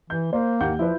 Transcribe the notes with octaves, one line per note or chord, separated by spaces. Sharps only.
E3 G6
A#3 C5
D#2 F#5 G6
F3 E4 F4 B4